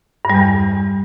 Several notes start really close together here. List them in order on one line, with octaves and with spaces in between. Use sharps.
G2 G3 E2